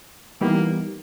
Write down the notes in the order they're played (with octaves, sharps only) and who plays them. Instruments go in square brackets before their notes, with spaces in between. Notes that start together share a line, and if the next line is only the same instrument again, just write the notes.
[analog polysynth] E3 G3 B3 D#4 G4 [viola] A#3